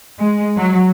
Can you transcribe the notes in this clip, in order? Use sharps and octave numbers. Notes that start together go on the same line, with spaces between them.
G#3
F#3